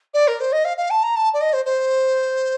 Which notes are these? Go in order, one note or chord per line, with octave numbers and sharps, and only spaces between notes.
D5
A#4
C5
D#5
F5
F5
A5
A#5
A5
D5
D#5
C5
C5